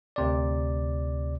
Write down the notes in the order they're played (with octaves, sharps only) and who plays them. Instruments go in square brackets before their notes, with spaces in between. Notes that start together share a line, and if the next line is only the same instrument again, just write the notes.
[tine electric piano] D2 C3 D5